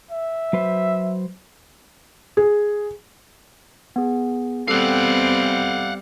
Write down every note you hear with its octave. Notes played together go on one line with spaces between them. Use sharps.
E5
F#3 B4 C5
G#4
B3 G#4
G3 B3 C4 A4 F5 F#5